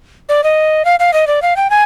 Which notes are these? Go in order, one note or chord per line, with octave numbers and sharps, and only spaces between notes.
D5
D#5
F5
F5
D#5
D5
F5
G5
G#5